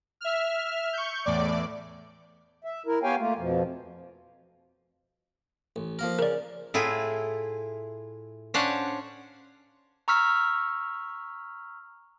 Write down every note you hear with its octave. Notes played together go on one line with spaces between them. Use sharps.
E5 F6
C#6 G6
E2 A2 D5 D6
E5
E4 A#4
B3 G4 C#5 F5 G5 G#5
A3 A#3 F4
F2 B2 F3
A1
F3 A#3 A#4
C#3 A#4 D5
A2 E4 F4 G#4
C#4 D4 C5 C#5 F5 F#5
A#5 C#6 E6 F6 B6